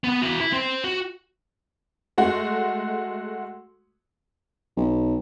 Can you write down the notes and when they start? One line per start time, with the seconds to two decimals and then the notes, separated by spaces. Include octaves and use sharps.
0.04 B3 F#5
0.22 E4 F#4
0.40 E4
0.53 C4 C5
0.84 F#4
2.18 G#3 A3 F#4
4.77 B1